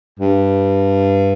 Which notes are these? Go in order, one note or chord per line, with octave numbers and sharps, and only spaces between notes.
G2